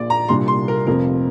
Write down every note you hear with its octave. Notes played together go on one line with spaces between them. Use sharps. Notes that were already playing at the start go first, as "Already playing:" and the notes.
Already playing: A#1 A#2 A#3 D5
A#5
C2 A#2 G3 D4 C6
C6
A#4
F1 F2 C3 F3 C4 A#4